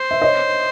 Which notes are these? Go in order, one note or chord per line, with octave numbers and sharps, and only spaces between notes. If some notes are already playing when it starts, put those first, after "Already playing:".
Already playing: C5
E5
C#5 D#5